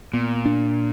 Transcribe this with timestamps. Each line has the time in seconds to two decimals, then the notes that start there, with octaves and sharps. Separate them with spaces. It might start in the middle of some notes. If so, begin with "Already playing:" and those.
0.13 A#2 B3
0.45 D4